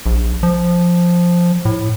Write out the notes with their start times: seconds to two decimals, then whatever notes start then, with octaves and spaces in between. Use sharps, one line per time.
0.06 A#1
0.43 F3
1.65 A2